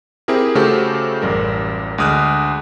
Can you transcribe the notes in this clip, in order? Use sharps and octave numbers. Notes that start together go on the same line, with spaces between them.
C4 E4 G4 G#4 A#4
C#3 A3 F#4 G4 A4 C5
A1 F#2 G3 A#4
D2 G#3 D#6 F6 F#6